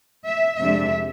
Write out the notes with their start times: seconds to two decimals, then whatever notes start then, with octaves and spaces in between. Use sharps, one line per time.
0.25 E5
0.59 F2 C3 G#3 D4 E5